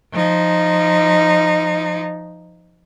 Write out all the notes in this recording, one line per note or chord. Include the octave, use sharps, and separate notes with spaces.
F3 D#4